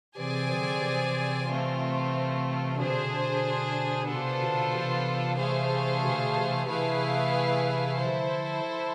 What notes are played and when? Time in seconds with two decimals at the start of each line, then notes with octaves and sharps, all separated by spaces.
0.16 C3 E3 C4 G#4 D5 G#5
0.49 D3 F3
0.81 C3 E3
1.47 A3 C4 F4
2.77 B2 D3 D4 G#4 C5
4.07 C3 B3 D4 F4 A4 C5
4.40 B2 D3
4.73 C3 E3
5.38 A3 D4 G#4 C5 F5
6.03 B2 D3
6.36 C3 E3
6.68 C3 E3 A3 E4 G#4 B4 F5
7.98 D3 F3 E4 A4 C5